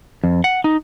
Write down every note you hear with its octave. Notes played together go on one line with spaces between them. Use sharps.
F2
F#5
D#4